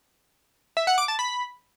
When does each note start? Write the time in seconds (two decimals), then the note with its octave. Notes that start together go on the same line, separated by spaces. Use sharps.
0.77 E5
0.87 F#5
0.98 D6
1.08 A5
1.19 B5